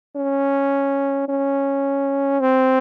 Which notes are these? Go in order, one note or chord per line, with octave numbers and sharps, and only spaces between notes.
C#4
C#4
C4